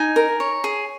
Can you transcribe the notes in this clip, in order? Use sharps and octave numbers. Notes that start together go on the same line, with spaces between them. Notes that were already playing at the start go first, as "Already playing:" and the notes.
Already playing: D#4 G#5
A#4
C#5
G#4